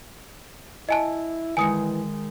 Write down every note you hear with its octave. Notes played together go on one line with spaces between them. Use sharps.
E4 D#5 G#5 A5
D#3 E3 G#3 G#5 D#6 C#7